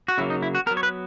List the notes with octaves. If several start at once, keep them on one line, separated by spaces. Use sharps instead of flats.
F#4
C#3 F#3 A#3 E4
D#4
E4
F#4
F#3 B3 A#4
C#5
B4